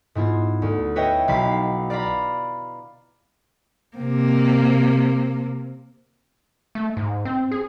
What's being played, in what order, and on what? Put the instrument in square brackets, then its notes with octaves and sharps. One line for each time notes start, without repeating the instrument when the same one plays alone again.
[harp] G#2 B3 E4 F4
D2
B4 C#5 D#5 E5 G5
B1 F5 B5 B6 C7
D5 F5 A#5 B5
[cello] C3 A#3
[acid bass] A3
G#2
C4
G#4